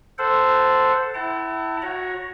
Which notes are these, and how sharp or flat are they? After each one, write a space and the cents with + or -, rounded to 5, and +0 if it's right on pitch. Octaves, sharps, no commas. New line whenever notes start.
A4 +0 C5 -10 F#5 +0
E4 +0 F#5 +40 A5 +35
F#4 -15 C#5 +0 A#5 +20